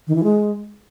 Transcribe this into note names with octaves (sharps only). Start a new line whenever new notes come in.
D#3
E3
G#3